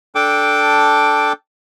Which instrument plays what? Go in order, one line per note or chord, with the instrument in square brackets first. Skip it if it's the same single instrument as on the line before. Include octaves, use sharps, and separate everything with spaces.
[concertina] D4 A4 G5 D6